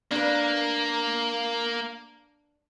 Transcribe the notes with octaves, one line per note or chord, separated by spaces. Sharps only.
A#3 D4 B4